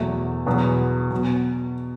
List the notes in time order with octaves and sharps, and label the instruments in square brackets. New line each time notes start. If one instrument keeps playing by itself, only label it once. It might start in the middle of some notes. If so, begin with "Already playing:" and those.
Already playing: [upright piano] E2 B2 F#3 A3
E2 B2 F#3 B3
B2 F#3